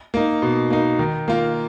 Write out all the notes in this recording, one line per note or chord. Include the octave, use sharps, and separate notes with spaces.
A#3 D#4
B2
A#3 D#4
D#3
A#3 F4 A#4